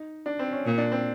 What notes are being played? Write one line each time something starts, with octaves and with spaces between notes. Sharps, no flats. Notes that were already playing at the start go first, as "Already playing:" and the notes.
Already playing: D#4
D4
C4
C#4
A#2
D4
C4